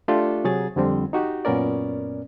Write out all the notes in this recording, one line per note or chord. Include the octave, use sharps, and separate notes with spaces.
A3 D4 F4 G4 A4
C3 F#3 G#4 A6
F2 D3 G3 C4
D#4 F#4 G4
F#2 A#2 B3 C#4 A#4 D5